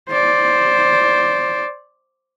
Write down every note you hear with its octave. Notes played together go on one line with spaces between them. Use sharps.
C5 D5